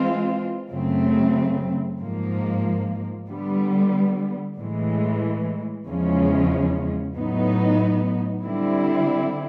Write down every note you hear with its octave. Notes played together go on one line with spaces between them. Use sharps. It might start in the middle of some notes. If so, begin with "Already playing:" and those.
Already playing: E3 G#3 C4 F4
F#2 C#3 F#3 A3 C4
G#2 F3 A#3
D3 G3 B3
A2 E3 G#3
E2 C#3 F3 G#3 C#4
A2 F#3 B3 D#4
D3 G3 C4 E4